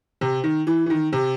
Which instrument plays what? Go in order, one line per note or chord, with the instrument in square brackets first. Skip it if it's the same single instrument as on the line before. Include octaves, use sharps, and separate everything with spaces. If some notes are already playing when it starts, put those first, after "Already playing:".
[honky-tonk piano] C3
D#3
E3
E3
D#3
C3